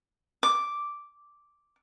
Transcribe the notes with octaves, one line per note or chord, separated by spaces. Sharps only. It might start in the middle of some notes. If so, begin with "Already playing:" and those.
D6